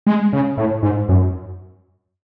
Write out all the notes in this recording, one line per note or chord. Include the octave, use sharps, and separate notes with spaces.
G#3
C#3
A2
G#2
F#2